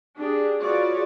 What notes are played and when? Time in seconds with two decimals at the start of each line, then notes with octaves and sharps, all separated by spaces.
0.16 D4 G4 G#4
0.61 F4 F#4 G#4 B4 C#5 D5